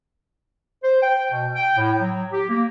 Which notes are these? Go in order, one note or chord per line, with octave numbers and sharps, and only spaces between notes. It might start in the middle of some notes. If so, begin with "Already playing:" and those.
C5
G5
B2
G5
A2
F#3
G4
A#3